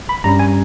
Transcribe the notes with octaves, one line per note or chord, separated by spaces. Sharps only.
B5
G2 G3 C#4 A#5
G#5